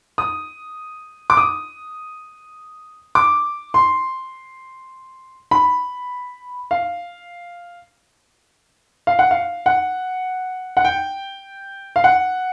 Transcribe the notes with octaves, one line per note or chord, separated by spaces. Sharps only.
D#6
D6
D#6
D6
C6
B5
F5
F5
F#5
F5
F#5
F#5
G5
F5
F#5